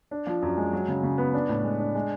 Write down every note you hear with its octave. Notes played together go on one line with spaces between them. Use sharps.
D4
F3
F#2
G#3
F#3
C#3
C#3
B3
D4
A2
G#3
D4
G#3